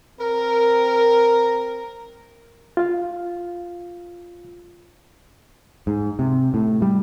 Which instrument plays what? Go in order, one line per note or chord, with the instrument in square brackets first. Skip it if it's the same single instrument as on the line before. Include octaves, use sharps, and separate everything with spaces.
[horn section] C4 A#4
[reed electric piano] F4 F5
[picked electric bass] G#2
C3
A2
G3